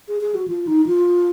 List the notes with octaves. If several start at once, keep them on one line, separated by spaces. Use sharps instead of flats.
G#4
G#4
F#4
F4
D#4
F4